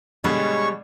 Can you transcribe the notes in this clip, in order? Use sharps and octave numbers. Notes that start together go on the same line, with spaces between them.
G2 B2 D3 G3 G#3 C#5 C#6